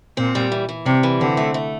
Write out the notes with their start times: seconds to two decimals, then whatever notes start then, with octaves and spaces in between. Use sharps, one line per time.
0.17 A#2 C4
0.35 G3
0.52 E3
0.69 E3
0.86 C3 G3
1.03 E3
1.20 D3 C4
1.37 A3
1.54 A3